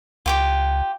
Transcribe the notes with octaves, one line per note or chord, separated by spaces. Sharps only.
C#2 F4 G4 D6